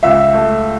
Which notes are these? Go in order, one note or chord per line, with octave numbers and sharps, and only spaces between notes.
C#2 E5
A3